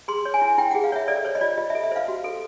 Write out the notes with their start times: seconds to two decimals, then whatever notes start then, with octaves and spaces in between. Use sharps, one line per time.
0.08 G#4 C6
0.25 C#5
0.34 G#5
0.42 E4
0.58 E4 G5
0.71 G#4 F#5
0.84 F5
0.92 C#5 E5
1.08 A4 D5
1.25 C5 C#5
1.35 D#5
1.41 F4 D5
1.58 F4 D#5
1.70 E5
1.75 A4
1.83 E5
1.92 C5 F5
2.08 F#4
2.24 A4